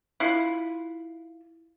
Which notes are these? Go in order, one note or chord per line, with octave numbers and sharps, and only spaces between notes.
E4 F4